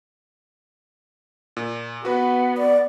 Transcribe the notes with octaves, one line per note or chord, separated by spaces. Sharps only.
A#2
B3 F#4 B4
D5